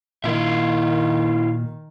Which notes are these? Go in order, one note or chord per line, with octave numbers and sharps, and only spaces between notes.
A#2 D#3 E4 F4 E5